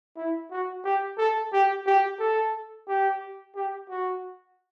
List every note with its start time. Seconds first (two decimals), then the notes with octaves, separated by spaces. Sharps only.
0.17 E4
0.51 F#4
0.85 G4
1.18 A4
1.53 G4
1.87 G4
2.19 A4
2.88 G4
3.56 G4
3.90 F#4